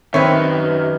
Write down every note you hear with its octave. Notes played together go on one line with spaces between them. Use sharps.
F#2 D#3 C4 B4 C#5 E5